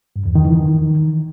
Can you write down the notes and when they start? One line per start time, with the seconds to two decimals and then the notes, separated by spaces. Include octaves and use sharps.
0.16 G2
0.26 E2
0.35 D#3
0.45 E3
0.55 D#3